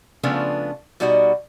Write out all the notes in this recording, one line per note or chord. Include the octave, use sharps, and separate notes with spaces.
C#3 F3 A3 B3 D4 F4
B2 G3 D#4 F#4 D5 D#5